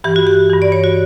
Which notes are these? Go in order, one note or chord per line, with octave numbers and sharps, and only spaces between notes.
G2 E3 G4
F#4
G4
G2 E3
D5
C#5
F#4